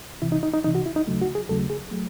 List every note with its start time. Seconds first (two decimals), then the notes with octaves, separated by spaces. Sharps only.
0.22 C2 C3 E3 E4
0.32 D#4
0.43 D#4
0.54 D#4
0.64 C2 C3 E3 D#4
0.75 F#4
0.86 E4
0.96 D#4
1.07 D#2 C#3 F#3 A3
1.21 F#4
1.35 G#4
1.49 D#2 C#3 F#3 A3 A4
1.70 G#4
1.91 F#3 A3